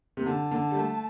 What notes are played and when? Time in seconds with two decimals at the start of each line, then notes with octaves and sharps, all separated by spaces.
0.17 C3
0.26 D3 A5
0.51 D3
0.71 G3
0.77 A3